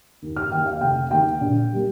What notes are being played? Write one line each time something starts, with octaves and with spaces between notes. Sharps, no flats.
D#2
F6
D#3 A#3 G5
F5
F1 G5
D#2 D#3 A#3 G5
A#1
G3 A#3